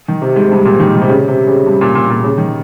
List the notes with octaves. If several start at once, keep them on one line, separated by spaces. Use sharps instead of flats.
D#3
C3
G#2
G2
A#2
D#3
D#3
C3
C#3
C3
C#3
G2
A#2
A#2
A#2
C#3
D#3